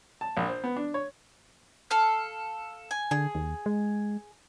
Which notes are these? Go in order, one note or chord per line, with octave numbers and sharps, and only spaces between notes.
A5
A#1
C5
B3
D4
C#5
A4 F5 F6
G#5
D3 G#4
D#2
G#3